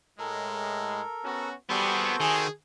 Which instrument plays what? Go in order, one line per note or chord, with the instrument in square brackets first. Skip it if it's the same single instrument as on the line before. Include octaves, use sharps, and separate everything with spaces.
[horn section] A2 G#3 [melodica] A4 A#4
[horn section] B3 C#4 F#4
[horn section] G3 [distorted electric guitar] B3 G#4 [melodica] F#4 A4 C5
[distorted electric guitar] D#3 [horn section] G#4